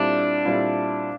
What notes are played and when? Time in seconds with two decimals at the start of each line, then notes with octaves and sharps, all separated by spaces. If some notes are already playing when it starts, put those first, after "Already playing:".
Already playing: A#2 G3 C4 D4 E4 A4
0.45 A#2 G3 C4 E4 A4